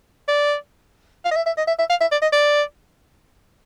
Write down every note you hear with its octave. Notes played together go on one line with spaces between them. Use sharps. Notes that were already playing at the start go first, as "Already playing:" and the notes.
D5
F5
D#5
E5
E5
D#5
E5
E5
F5
E5
D5
D#5
D5